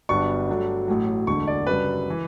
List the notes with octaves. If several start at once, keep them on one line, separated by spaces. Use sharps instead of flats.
G1 G2 F#3 B3 D4 C#6
G2 F#3 A3 D4
A1 A2 F#3
E1 D2 D3 C#6
D5
F#2 C#3 G3 D4 B4
E3